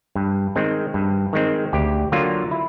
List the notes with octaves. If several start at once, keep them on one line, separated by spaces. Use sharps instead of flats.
G2
D#3 G#3 C4
G2
D#3 G#3 C4
D2 G4
D3 F#3 A#3 F4
E4